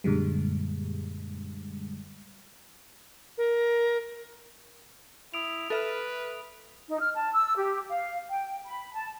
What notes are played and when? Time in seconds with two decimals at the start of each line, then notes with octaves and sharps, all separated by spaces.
0.04 F#2 A#2 D3 G3 G#3
3.38 A#4
5.34 E4 D#6 D7 F7
5.70 A4 B4 E5 F6
6.88 D#4
7.00 F6
7.13 A5
7.33 E6
7.56 G4
7.88 F5
8.31 G5
8.66 B5
8.94 A5